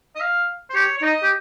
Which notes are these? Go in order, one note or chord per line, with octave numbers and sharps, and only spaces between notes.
D#5
F5
C5
G4 C#5
C#5
D#4 D#5
G4